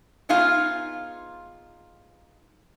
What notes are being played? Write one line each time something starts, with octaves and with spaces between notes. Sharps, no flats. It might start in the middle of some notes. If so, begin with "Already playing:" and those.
B3 D#4 F4 G#4 F5